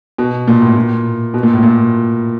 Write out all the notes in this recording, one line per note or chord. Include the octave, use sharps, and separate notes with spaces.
B2
A#2
A2
A#2
B2
A#2
A2
A#2